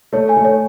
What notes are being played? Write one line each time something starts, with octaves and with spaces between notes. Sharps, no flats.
A3 C#5
G#5
A3
C#5